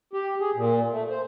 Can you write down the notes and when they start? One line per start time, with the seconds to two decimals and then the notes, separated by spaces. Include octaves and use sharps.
0.13 G4
0.40 G#4
0.56 A#2
0.92 A3
1.10 C5